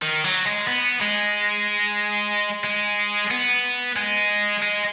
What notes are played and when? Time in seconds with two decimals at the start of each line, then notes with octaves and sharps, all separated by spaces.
0.02 D#3
0.24 F#3
0.46 G#3
0.67 B3
1.01 G#3
2.65 G#3
3.31 B3
3.96 G#3
4.63 G#3